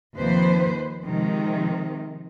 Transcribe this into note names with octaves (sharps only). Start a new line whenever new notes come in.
D#2 C3 F3 B4 C5
C3 D#3 F3 G#3